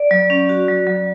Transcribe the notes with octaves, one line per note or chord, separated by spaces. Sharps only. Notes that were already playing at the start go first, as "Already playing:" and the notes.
Already playing: D5
F#3
C#4
F#4
F#3
F#3